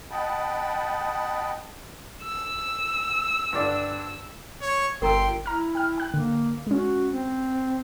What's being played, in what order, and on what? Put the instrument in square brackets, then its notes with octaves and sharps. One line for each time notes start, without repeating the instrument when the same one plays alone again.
[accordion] D#5 F#5 G5 A5 B5 D#6
[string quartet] E6
[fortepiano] G2 D3 D4
[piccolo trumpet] C#5
[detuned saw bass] G1 [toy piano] A#4 A#5 E6 [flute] G5 [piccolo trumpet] C6
[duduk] E4 [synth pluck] A#5 F6
[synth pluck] G5 F6
G5 F#6
[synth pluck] D3 [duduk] A#3
[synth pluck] G#3 C#4 [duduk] F#4
[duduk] C4